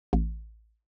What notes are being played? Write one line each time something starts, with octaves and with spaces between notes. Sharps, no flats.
A1